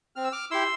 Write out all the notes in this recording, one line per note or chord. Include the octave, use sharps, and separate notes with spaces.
C4 F6
E6
D6 F6
E4 G4 C6 E6